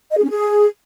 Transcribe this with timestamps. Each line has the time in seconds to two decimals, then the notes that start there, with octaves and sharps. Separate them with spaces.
0.11 D#5
0.17 G#4
0.23 C#4
0.30 G#4